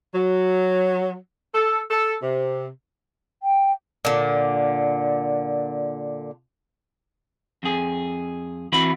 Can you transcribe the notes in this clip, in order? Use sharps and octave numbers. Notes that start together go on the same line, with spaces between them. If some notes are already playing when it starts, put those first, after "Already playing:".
F#3
A4
A4
C3
G5
A#2 D3
F2 G#4
E2 E3 B3 C4 F#4 B5